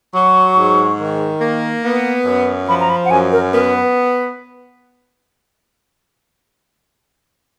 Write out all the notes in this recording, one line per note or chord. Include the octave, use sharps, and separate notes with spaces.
F#3 C#6
G#2
D#3
A#3
B3
F#2
F3 B5
A#5
B5
F#5
F#2 G#5
A#4
B3 A#4
B4